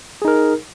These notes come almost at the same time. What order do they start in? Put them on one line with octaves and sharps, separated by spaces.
G#4 D#4 A#4